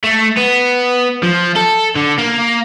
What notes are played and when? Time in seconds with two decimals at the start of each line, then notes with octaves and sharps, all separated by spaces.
0.04 A3
0.37 B3
1.23 F3
1.56 A4
1.96 D3
2.18 A#3